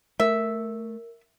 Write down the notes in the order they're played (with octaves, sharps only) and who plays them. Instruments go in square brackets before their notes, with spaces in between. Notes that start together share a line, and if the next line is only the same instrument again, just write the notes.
[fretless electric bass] A3 [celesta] A#4 [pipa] E5